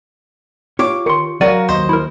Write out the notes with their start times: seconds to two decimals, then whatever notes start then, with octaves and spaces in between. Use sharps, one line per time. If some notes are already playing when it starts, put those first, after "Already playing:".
0.79 F4 G4 C#5 D6
1.06 D#3 C6 C#6 C#7
1.41 F#3 F#4 A#4 D5 F5 D#7
1.69 D#2 C5 D#5
1.89 E4 A#4